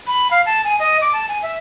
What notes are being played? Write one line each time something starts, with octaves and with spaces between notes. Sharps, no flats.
B5
F5
A5
G#5
D#5
D6
A5
G#5
E5